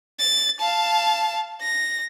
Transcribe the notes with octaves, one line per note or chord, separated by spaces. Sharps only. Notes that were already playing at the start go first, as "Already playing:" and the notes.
A6
F5 A5
A#6